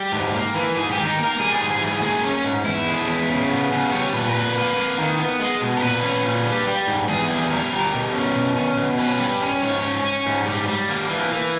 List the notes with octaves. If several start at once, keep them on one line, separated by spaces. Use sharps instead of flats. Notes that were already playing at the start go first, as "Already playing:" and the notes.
Already playing: G3 G4
G#2
A#3
E3
G#2 G#4
G4
D#3
D#4
A#3
A#4
G3 G#4
G#4
G#2
G#4
E3
G#4
A#3 G#4
C#4
G#2
E2 E4
G#3
E2
C#3
B3
C#3
G3 C#5
A#2 B4
A#4
A#2 B4
A#3
A#3
D#3
B3
G#3
B2
A#4
A#2 B4
C#4
A#2
G3
G3
G#2
E2 G#4
G3 G#4
G3 A#4
G3
B2
C#4
B2
C#4
B2
C#4 B4
G3
C#4
G#2 C#5
C#4
C#4
G#2
G3
G3
A#3
E3
E3